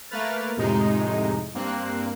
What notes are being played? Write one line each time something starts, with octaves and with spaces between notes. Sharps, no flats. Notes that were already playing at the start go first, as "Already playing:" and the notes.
A3 A#3 A#4 B4 F6 A6
F2 A2 C3 G#3 D#4
G2 A#3 C4 F#6